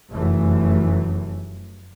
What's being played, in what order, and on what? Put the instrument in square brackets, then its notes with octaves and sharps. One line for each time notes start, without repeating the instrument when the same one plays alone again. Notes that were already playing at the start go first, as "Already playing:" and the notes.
[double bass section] F1 F#2 E3 A3